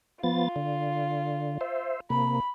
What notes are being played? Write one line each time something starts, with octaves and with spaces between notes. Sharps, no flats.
F3 B3 F4 A6
D3
C5 E5
C3 A#3 B5